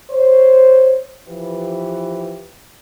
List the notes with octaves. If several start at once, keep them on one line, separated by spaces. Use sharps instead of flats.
C5 C#5
E3 F3 G4 B4